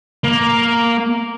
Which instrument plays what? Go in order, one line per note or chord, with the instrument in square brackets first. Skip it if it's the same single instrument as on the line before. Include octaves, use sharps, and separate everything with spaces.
[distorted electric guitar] A#3